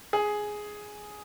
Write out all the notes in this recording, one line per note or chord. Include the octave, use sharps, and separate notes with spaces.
G#4